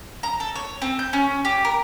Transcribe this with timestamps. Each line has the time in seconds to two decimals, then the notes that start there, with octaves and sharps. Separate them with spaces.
0.23 A#5
0.40 A4
0.55 C#5
0.82 C4
0.99 G6
1.13 C#4
1.45 G4
1.65 A#4